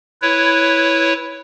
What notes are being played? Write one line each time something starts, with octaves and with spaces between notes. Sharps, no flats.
E4 B4 C#5